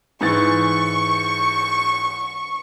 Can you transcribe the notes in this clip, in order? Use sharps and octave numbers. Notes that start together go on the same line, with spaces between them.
G#2 E3 C#6 A6